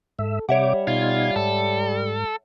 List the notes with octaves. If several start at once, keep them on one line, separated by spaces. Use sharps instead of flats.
G#2 A4 E5
C3 G3 G4 C#5 E5 F#5 D6
B2 D#4 F4 G#6
G#2 A4